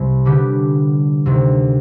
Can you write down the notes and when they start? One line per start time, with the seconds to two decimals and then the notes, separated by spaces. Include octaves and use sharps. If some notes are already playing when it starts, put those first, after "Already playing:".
Already playing: C2 C3
0.25 D3 G3 B3 D4 G4
1.26 D2 C3 D#3